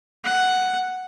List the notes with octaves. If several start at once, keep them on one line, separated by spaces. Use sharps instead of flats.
F#5